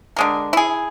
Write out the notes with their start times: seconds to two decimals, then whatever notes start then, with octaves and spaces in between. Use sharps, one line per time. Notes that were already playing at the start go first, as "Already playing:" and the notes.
0.17 D3 G#3 A#4
0.53 E4 G#4